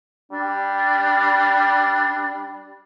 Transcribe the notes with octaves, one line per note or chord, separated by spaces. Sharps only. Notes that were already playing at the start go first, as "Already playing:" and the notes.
G3 D4